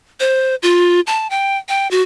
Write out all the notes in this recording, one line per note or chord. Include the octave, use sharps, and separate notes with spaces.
C5
F4
A5
G5
G5
F#4